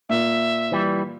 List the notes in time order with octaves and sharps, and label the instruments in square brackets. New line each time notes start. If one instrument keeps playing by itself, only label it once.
[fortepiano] A#2 [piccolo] E5
[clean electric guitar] E3 G3